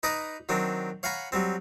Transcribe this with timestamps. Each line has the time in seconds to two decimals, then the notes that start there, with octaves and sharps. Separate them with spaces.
0.03 D#4 B4 D5 D#5 A#5 D#6
0.49 D#3 F#3 C4 D4
1.03 C#5 F5 F#5 G#5 A#5 B5
1.32 F#3 G3 C4